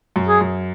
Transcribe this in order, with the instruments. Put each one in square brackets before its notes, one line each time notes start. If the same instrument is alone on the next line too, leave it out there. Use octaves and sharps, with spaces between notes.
[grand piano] F#2
[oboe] G#4
[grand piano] F#2